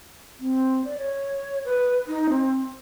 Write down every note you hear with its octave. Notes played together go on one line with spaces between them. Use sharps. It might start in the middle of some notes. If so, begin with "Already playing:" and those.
C4
D5
C#5
B4
D#4
C4